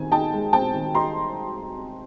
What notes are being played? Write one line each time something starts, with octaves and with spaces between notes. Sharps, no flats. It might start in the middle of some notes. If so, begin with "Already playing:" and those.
Already playing: D#3 C4 G#5
D#4 G5 A5
G#3
C4 G5 A5
D#3
D#4 A#5 C6